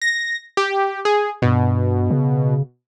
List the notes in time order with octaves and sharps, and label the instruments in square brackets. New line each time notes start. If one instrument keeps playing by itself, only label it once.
[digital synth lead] A#6
G4
G#4
[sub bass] G2 [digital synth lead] B2
[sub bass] C#3